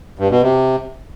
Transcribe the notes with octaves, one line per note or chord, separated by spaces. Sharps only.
G2
B2
C3